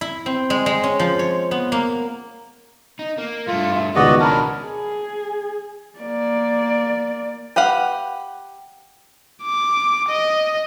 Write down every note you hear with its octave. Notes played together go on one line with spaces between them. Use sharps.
E4
C4
G#3
G#3
C#4
F3
C#5
B3
A#3
D#4
A#3
G2 A3 F4
E5
C#2 B2 D#3 B3 F#4 D5 D#5
C#4 D4 A#4 A5 B5
G#4
A#3 D5
G4 B4 F5 F#5
D6
D#5